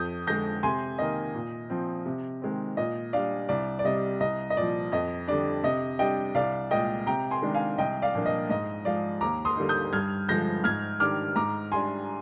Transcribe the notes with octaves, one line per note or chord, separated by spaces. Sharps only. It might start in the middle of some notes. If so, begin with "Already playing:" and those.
Already playing: F2 D#6 G6
D3 G#3 G6 A#6
C3 G#5 C6
D#3 A#3 D#5
A#2
F3 C4
C3
D#3 G#3 C4
A#2 D#5
G3 D4 D5 F5
C2 D5
D5
C3 G3 D#5
C2 D#5
D#5
A#2 F3 D5
F2 D#5
D3 G3 D4 D5
C3 D#5
G3 D4 D#5 G5
C2 D5 F5
A#2 G#3 D#5 G5
C3 G5 A#5
G#5 C6
D#3 G#3 D4
F5 G#5
C2 D#5 G5
D5 F5
A#2 F3 A#3 D4
D#5
G#2 D#5
F3 G#3 D5 F5
D#2 A#5 D6
C6 D#6
D3 G3 A#3 D#4
D#6 G6
G2 F6 G#6
D3 F3 G#3 G6 A#6
G#2 F6 G#6
D#3 G3 D4 D6 F6
G#2 A#5 D6
G3 D4 G#5 C6